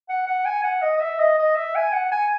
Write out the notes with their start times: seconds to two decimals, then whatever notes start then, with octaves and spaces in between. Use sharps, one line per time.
0.09 F#5
0.27 F#5
0.45 G#5
0.63 F#5
0.82 D#5
0.96 D#5
1.01 E5
1.19 D#5
1.38 D#5
1.56 E5
1.75 G#5
1.93 F#5
2.11 G#5